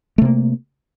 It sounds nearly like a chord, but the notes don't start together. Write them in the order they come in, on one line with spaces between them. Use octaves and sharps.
A3 C3 A#3